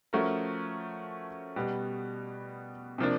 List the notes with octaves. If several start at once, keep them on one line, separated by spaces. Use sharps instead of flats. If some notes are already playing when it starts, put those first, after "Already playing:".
F3 A3 C#4 F#4 A#4
B2 G3 B3
C3 F3 A#3 D4